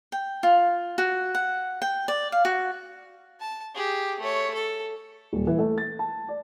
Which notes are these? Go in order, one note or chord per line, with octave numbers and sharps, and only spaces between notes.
G5
F4
F#4
F#5
G5
D5
F5
F#4
A5
G4 G#4
A3 C#5
A4
D#1
E3
A3
A6
A5
D5